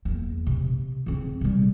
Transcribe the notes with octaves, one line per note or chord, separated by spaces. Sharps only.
E2 A#3
C3
C#3 C4
C3 G3